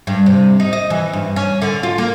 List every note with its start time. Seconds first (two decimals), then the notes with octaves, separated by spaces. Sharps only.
0.07 G2
0.26 C3
0.60 D#4
0.73 D#5
0.90 E3
1.13 G2
1.36 C#4
1.62 D3
1.83 F4
1.98 A#3